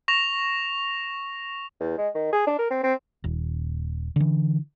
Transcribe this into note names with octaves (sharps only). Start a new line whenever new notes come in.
C#6 A#6 F7
E2
G#3
D#3
G#4
D4
A#4
C4
C4
D#1
D3 E3